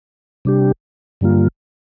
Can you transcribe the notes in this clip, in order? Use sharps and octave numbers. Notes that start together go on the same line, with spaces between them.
C3 G3 D4 G4
G2 D3 G3 A#3 F4